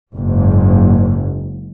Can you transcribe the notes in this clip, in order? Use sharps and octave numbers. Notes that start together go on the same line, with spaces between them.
F#1 G#2